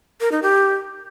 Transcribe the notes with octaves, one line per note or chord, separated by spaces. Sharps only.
A#4
D#4
G4